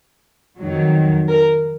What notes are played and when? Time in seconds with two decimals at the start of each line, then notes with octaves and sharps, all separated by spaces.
0.59 F2 D#3 F#3
1.29 A#4